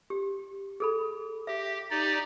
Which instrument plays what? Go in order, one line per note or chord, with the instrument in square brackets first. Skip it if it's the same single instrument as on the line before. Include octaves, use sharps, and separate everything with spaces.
[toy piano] G4
G#4 A4 B5
[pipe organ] G4 [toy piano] E5
[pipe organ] D#4 G4 D5